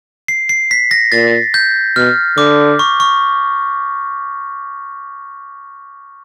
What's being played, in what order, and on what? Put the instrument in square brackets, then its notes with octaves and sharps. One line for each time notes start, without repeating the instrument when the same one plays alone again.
[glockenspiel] C7
C7
B6
A#6
[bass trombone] A#2 [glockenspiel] A6
[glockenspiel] G6
[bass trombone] B2 [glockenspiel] F6
[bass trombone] D3 [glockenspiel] D6
[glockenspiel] C#6
C#6